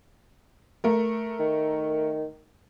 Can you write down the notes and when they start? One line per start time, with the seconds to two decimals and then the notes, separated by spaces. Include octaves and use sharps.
0.84 A3 A#4
1.39 D#3